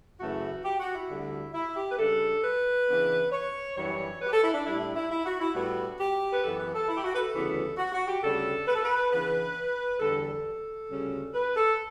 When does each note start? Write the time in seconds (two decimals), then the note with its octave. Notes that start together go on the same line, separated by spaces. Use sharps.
0.20 F#2 C#3 E3 A3 F#4
0.65 G4
0.80 F#4
0.95 E4
1.09 D2 D3 G3
1.54 E4
1.76 G4
1.90 B4
1.98 C#3 G3 D4 A4
2.43 B4
2.88 C#3 E3 B3 D4
3.32 C#5
3.76 F#2 E3 G3 D4 C#5
4.21 B4
4.27 G4
4.32 A4
4.43 E4
4.54 D4
4.66 A2 G3 D4 E4
4.81 E4
4.95 E4
5.10 E4
5.25 F#4
5.40 E4
5.55 A2 G3 B3 D4 F#4
5.99 G4
6.32 B4
6.44 F#2 E3 B3 A4
6.59 B4
6.73 A4
6.89 E4
6.97 G4
7.04 F#4
7.14 B4
7.18 A4
7.34 D2 C#3 E3 G3 B3
7.77 F#4
7.92 F#4
8.08 G4
8.22 D2 C#3 G3 D4 A4
8.67 B4
8.75 A4
8.84 B4
9.11 C#3 E3 B3 D4 B4
10.00 E2 D3 G3 A4
10.23 A4
10.89 D2 C#3 G3 C#4
11.34 B4
11.56 A4